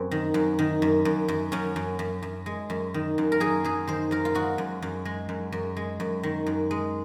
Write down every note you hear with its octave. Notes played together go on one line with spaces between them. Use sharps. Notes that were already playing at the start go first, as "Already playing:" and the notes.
Already playing: F#2 C4
D#3
F#2
D#3
F#2
F#2
F#2
F#2 C#4
F#2
F#2
F#2
G#3
F#2
D#3
F#2
A#4
F#2 G#4
F#2 G#4
D#3 C5
F#2 A#4
F4
G#3 F#4
F#2
F#2
G#3
F#2
F#2
G#3
F#2
D#3
F#2
G#3